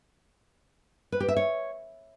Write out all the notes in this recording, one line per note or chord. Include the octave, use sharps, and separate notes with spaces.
B4
G4
E5
C#5